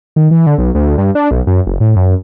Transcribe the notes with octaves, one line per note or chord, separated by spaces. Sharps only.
D#3
E3
D3
B1
D2
G2
D4
B1
F#2
F#1
A2
F#2